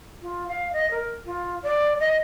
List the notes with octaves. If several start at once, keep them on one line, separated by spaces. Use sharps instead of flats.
F4
F5
D#5
A#4
F4
D5
D#5